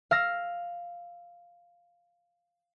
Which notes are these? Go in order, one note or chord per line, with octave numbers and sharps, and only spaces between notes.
F5 E6 A#6